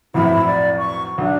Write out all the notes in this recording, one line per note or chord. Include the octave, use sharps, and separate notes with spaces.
B1 F2 A2 E4
D5
C#6
B1 D4